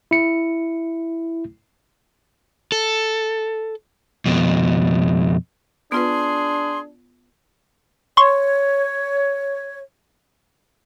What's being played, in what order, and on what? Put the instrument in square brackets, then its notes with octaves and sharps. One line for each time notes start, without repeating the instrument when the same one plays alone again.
[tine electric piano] E4 C#7
[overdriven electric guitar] A4
F2 B2
[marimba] B3 F4 B4 [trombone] D4 [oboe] G#4 [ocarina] C6
[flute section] C#5 [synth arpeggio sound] C6 C#6